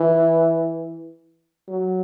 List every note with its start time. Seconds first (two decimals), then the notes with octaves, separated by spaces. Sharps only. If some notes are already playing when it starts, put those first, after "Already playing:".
Already playing: E3
1.68 F#3